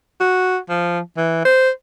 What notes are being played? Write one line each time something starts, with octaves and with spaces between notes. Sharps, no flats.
F#4
F3
E3
C5